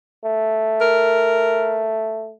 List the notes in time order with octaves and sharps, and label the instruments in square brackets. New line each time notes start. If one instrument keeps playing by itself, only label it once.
[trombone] A3
[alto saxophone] A#4